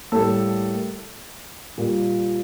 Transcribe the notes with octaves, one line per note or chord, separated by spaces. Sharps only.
A2 G3 A#3 A4
A#2 G3 A#3